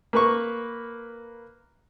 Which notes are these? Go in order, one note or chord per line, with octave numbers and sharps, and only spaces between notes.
A#3 B4 C#6